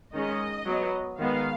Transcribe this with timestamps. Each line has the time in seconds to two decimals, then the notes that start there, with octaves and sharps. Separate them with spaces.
0.14 D#3 G#3 C#4 D#5
0.66 F#3 B3
1.19 D#3 G#3 B3 F5